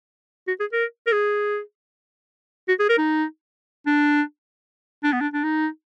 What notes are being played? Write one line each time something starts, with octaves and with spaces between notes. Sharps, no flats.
F#4
G#4
A#4
A#4
G#4
F#4
G#4
A#4
D#4
D4
D4
B3
D4
D4
D#4